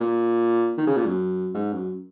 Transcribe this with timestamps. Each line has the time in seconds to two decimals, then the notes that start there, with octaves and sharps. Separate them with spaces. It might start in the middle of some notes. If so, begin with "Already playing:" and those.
0.01 A#2
0.77 D#3
0.87 C#3
0.97 A#2
1.06 F#2
1.54 G#2
1.73 F#2